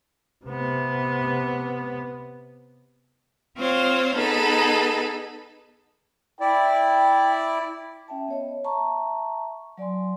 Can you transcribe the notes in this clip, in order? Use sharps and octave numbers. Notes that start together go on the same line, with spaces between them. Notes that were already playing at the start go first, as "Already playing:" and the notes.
C3 B3
C4 F4 C5 C#5
B3 D#4 G#4 A4 B4
E4 D5 G5
C#4 E5 G5 A5
B3 C#5 D#5
E5 A5 A#5 C#6
F#3 D5 G#5 C6